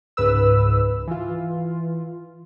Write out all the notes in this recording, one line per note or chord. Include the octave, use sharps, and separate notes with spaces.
C#2 G#2 B4 E6
E3 F4